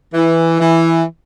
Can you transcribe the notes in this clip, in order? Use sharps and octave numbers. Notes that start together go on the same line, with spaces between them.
E3
E3